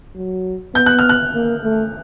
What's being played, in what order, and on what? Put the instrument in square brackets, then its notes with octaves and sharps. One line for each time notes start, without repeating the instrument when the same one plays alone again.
[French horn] F#3
[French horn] B3 [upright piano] G6
[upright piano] F#6
F6
F#6
[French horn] A#3
A3